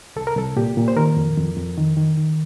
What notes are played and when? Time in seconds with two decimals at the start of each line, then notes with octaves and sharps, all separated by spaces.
0.16 C2 A4
0.27 A#4
0.37 C2 A4
0.56 A#2 G4
0.77 A#2
0.88 C5
0.96 D#3 A#4
1.17 F2
1.37 F2
1.57 F2
1.77 D#3
1.97 D#3
2.17 D#3